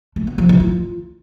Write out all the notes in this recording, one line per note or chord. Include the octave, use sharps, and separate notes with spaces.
A3
B3
F3
E3
F4